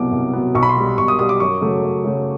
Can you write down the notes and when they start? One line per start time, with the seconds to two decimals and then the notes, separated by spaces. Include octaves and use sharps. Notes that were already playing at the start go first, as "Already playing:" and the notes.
Already playing: C2 B2 F#3 B3 D6
0.12 C2
0.33 B2 F#3 B3
0.55 B1 C#6
0.63 B5
0.69 C6
0.76 B2 G3
0.98 B1 C#6
1.08 D#6
1.19 B2 G3 D#6
1.29 D6
1.40 F#2 C#6
1.61 C#3 F#3 A3
1.83 F#2
2.04 C#3 F#3 A3